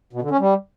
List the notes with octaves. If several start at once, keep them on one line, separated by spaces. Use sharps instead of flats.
B2
D3
C#4
G3